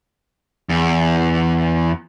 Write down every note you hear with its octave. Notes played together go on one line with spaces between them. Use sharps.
E2